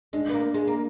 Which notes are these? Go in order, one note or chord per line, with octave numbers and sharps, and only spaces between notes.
G#3 D4
B3
A#3
G#3
A#3